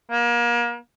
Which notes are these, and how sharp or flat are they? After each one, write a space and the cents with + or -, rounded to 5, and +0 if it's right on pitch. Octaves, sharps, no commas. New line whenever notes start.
A#3 +35